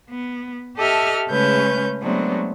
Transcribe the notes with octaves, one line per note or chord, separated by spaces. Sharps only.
B3
G4 A4 D#5 E5 A5 F6
C#3 G#3 A3 C#4 B4 G6
F#3 G#3 A3 B3 C4 D4